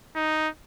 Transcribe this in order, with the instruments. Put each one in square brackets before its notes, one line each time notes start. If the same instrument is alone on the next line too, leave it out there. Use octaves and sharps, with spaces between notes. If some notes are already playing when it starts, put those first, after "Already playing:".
[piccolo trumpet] D#4